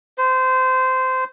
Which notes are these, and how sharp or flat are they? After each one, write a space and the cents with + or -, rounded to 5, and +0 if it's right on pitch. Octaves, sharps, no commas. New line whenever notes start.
C5 -20